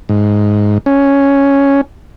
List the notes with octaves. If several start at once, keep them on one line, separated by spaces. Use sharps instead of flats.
G#2
C#4